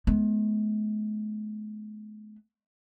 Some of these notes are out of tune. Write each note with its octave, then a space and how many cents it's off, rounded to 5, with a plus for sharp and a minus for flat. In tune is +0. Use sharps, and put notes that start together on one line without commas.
G#3 +45 B3 +0